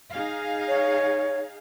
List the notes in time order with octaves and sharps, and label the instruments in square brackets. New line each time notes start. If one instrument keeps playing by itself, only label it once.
[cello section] D#4 G#4 F5
[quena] C#5